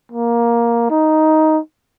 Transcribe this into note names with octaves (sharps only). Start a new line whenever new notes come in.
A#3
D#4